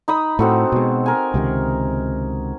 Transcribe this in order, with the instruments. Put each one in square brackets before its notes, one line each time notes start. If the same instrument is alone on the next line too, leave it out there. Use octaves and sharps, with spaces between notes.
[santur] D#4 B5 D#6
[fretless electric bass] A2 [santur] C4 F#4 A4
[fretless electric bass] B2 G#3
[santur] A#4 G#5
[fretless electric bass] C#2 C3 D#3